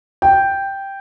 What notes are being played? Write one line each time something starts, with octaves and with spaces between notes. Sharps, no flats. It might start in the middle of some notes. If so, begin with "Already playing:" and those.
G5